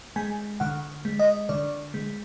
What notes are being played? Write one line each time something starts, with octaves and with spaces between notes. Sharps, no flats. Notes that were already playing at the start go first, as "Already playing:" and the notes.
G#3 G#5
D3 F#5
G#3
D#5
D3 D5
G#3